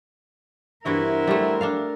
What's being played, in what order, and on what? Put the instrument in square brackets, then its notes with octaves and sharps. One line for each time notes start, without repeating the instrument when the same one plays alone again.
[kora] G2 E3 F#4 [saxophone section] B3 C4 E4 [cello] A#4
[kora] G3 A3
D4 A4 F5